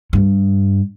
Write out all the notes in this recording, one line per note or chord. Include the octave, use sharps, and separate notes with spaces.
G2